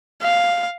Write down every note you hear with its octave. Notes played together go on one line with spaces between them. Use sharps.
F5